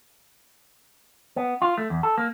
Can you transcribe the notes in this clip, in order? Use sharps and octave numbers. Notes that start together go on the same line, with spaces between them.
B3
F4
A3
E2
A4
A#3